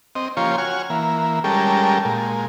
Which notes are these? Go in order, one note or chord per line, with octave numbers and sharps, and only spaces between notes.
C4 D#5
F3 A#3 C#4 F4 G4 C#5
F#4 C#5 G#5 F6
E3 A#3
G3 G#3 C#4 G4 A4 A#4
A#2 G#3